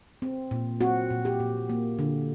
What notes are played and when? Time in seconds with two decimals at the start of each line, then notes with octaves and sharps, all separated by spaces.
0.22 C4
0.51 A#2
0.81 C4 F#4
1.11 A#2
1.25 G4
1.40 A#2
1.69 A#3
1.99 D3